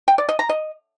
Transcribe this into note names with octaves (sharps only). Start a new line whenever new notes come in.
G5
D5
D#5
A#5
D#5